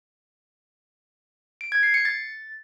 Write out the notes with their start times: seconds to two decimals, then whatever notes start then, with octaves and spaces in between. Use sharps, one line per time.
1.61 D7
1.72 G#6
1.83 C7
1.94 C#7
2.05 A6